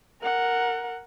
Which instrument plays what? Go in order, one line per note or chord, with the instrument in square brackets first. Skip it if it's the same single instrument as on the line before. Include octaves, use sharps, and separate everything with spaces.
[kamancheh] A#4 F#5